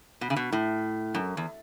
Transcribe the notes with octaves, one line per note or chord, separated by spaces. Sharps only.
B2
C#3
B2
A2
F#2
E2